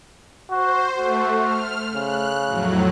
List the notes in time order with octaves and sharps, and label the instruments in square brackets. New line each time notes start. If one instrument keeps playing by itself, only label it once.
[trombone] F#4 [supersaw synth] C5
[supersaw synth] A3 [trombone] F#4
[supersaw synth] F6
[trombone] C#3 [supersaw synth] F#6
[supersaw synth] F2 A2 F#3